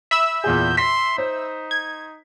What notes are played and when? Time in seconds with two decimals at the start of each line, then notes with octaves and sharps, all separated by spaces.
0.11 E5 B5 E6
0.44 E2 A#2 G#4 G6
0.77 C6 B6
1.18 D#4 C5
1.71 G#6